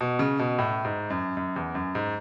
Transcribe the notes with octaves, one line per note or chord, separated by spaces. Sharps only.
B2
C#3
B2
A2
G#2
F#2
F#2
E2
F#2
G#2